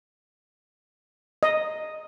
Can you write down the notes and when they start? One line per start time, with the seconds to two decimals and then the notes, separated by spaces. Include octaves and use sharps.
1.43 D#5